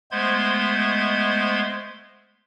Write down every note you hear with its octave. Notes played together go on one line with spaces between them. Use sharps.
G#3 A3 B3 C5 C6 G#6